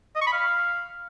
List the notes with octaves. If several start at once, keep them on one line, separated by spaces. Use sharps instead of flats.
D#5
C#6
B5
F5